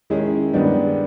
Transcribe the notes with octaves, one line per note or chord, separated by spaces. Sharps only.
D#3 G#3 C#4 E4 G#4
G2 D#3 G#3 B3 D4